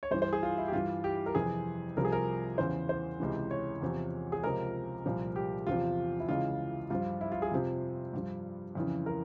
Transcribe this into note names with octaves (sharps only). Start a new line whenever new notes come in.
C#5
G2 E3 C5
C5
G#4
F4
E4
G4
G2 E3 F4
G4
A#4
F2 C3 E3 G#4
C2 C3 F3 A#4
G#4
A#4
E2 C#3 E3 C5
C5
C#2 C3 E3
C#5
E2 C3 F3
G#4
C#2 C3 F3 A#4
C2 A#2 F3
G4
E2 C3 F3 F4
E4
C#2 C#3 E3 F4
G2 F3 F4
E4
F4
G#4
F2 C3 F3
G2 F3
F2 C#3 E3
A#4